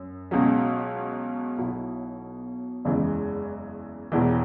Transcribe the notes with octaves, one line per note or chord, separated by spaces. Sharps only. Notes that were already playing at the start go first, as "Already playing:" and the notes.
Already playing: F#2
C#2 B2 F#3 C#4
B1 B2 F#3 E4
F#1 E2 C#3 E3 G#3
E1 E2 E3